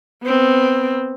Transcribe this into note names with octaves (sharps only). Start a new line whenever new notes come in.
B3 C4